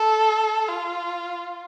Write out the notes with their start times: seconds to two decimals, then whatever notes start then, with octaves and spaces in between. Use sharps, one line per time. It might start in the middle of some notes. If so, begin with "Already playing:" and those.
Already playing: A4
0.68 F4